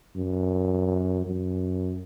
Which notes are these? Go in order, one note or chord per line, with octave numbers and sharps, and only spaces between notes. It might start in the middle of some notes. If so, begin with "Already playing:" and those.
F#2
F#2